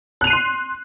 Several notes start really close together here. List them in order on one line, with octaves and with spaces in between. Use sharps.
F#6 F7 D#7 C7 C6